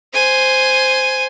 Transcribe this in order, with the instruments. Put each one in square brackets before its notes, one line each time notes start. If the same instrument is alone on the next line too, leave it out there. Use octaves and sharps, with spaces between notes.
[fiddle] C5 G#5